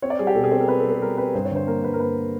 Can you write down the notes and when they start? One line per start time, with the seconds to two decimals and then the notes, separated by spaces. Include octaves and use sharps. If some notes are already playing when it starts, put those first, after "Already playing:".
0.02 C4 C#5
0.10 D5
0.19 G3 G#4
0.27 G4
0.35 B2 A4
0.44 G#4
0.51 C4 A4
0.60 A#4
0.68 C4 B4
0.80 A4
0.85 G3
0.90 A4
1.01 G3 A#4
1.18 C4 B4
1.34 G2 C5
1.45 C#5
1.51 D3
1.56 C5
1.67 A#3 A#4
1.84 G2 B4
1.93 A#4
2.00 A#3 B4